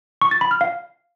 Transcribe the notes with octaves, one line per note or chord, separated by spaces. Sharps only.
C#6
A6
B5
F6
F5